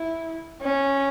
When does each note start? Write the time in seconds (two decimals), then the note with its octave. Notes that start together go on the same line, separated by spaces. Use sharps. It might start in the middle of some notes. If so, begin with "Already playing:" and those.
Already playing: E4
0.62 C#4